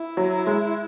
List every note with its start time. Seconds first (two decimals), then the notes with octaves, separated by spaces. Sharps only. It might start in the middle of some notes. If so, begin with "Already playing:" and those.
Already playing: E4
0.17 F#3
0.47 G#3